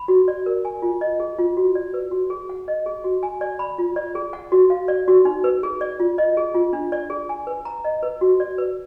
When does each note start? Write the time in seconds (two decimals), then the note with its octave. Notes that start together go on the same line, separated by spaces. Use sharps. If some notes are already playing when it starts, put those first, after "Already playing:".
Already playing: B5
0.08 F#4
0.28 D5
0.46 A#4
0.65 G#5
0.82 F4
1.01 D#5
1.20 G#4
1.38 F4
1.57 F#4
1.75 D5
1.94 B4
2.11 F#4
2.30 G#4
2.49 F#5
2.68 D#5
2.86 G#4
3.04 F#4
3.23 G#5
3.41 D5
3.59 B5
3.78 F4
3.96 D5
4.15 G#4
4.33 F#5
4.52 F#4
4.70 F5
4.88 D5
5.08 F#4
5.25 D#4
5.44 B4
5.63 G#4
5.81 D5
6.00 F4
6.18 D#5
6.37 G#4
6.54 F4
6.73 D4
6.92 D5
7.10 G#4
7.29 G#5
7.47 B4
7.65 A#5
7.84 D#5
8.03 B4
8.21 F#4
8.40 D5
8.58 B4